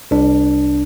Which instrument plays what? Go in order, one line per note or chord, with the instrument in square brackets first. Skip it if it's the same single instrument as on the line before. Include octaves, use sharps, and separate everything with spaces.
[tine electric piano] C2 D4